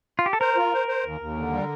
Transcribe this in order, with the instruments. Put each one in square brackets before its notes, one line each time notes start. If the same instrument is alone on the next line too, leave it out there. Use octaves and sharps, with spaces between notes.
[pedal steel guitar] F4
G4
A4
[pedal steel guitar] A#4 [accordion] C5
[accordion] F4
C5
C5
D#2
D#2
D3
G3